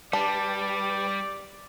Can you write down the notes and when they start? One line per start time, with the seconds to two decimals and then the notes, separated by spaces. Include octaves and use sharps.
0.13 G3 D4 G4 B4 D5